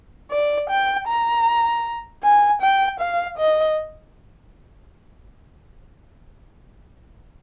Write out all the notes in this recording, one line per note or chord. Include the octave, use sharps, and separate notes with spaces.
D5
G5
A#5
G#5
G5
F5
D#5